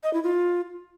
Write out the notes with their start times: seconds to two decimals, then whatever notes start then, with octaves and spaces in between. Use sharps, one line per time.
0.03 D#5
0.13 E4
0.23 F4